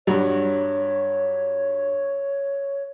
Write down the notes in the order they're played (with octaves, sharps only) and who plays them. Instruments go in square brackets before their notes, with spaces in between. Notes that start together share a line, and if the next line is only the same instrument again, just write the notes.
[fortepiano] G2 F#3 [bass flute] C#5